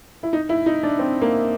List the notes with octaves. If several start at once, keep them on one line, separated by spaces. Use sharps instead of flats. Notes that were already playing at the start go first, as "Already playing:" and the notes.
E4
D#4
E4
D#4
D4
C4
A#3